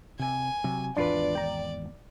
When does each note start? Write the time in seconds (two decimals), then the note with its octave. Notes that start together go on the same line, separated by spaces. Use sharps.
0.19 C3 G#5
0.64 C3 F#3
0.96 G#1 E2 D4 F4 B4 D5
1.35 G5 A#5